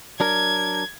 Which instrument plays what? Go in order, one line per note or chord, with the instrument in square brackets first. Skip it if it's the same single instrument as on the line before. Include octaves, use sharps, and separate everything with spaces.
[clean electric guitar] F#3 D4 A#4 [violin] G#6